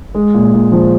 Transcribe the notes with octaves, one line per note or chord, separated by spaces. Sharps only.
G#3
A#2
A#2
F3